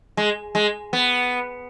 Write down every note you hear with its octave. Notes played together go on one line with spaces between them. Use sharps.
G#3
G#3
B3